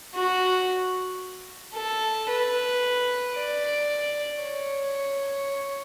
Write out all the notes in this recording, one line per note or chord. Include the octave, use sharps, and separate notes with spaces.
F#4
A4
B4
D5
C#5